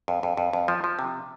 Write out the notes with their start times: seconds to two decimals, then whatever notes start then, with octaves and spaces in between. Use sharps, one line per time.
0.08 F2
0.23 F2
0.37 F2
0.53 F2
0.68 F3
0.84 F3
0.99 C3